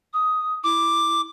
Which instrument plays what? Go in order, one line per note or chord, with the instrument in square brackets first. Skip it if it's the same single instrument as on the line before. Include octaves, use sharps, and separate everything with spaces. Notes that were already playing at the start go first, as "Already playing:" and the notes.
[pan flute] D#6
[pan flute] E4 [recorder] D6